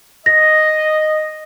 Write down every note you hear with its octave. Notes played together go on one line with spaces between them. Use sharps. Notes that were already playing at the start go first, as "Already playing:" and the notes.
D#5 A#6